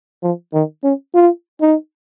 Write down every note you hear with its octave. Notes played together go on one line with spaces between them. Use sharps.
F3
D#3
C#4
F4
D#4